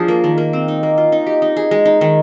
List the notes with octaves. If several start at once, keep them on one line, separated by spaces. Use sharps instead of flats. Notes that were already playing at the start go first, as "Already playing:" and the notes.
Already playing: F3 D4 G#4
A#3
D#3
A#3
C4
D#4
A#3
F4
D#4
G4
D#4
G#4
G#3
D#4
D#3